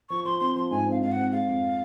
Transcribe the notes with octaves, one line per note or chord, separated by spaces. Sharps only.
F3 C#6
F3 C6
C4 C6
F3 C6
G#2 G#5
C4 F5
G#2 F5
F#5
C4
G#3 F5
F2